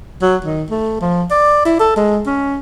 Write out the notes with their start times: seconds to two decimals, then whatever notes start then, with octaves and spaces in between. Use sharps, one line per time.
0.22 F#3
0.44 D#3
0.70 A3
1.01 F3
1.31 D5
1.65 E4
1.79 A4
1.96 G#3
2.26 C#4